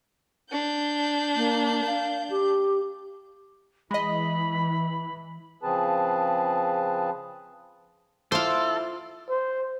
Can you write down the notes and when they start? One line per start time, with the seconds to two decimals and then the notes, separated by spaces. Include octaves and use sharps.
0.51 D4 G6
1.36 A#3
1.87 F5
2.30 G4
3.91 E3 G#3 D#5 B5
5.63 C#3 F3 C4 G#4 B4 A5
8.32 E4 F4 A4 C5 F5 D6
9.29 C5